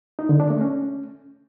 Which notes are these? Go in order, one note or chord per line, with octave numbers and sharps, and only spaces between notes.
D#4
D3
D4
A3
C#4